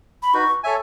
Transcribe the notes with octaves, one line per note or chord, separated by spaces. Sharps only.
B5
D#4 F#4 B4 C#6
A4 C#5 E5 G#5